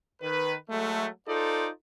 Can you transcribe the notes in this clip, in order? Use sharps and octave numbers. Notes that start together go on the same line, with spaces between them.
D#3 B4
F#3 G#3 A3
D#4 F4 A4 C5 D5